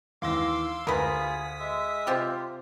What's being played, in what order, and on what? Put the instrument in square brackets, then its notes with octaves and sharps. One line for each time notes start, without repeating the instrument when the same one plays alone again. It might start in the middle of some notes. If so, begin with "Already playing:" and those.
[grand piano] D#2 E3 A#6 [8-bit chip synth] F5 C6 E6 [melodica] D6
[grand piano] D2 [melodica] F4 G#4 [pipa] A#4 B4 [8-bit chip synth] D#6 B6
[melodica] G#3 E5
[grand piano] C3 [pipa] C4 F4 G4